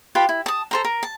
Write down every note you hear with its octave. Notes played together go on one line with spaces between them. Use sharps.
F4 G4 B4 B5
E4
A5 D#6
A4 C5 A#5
A#4
A5